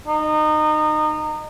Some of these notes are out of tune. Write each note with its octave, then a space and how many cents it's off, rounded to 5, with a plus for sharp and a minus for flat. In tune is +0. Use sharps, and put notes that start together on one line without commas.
D#4 -25